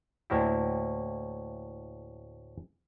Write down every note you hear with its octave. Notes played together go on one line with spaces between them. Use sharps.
D2 A2 A#3 C4 E4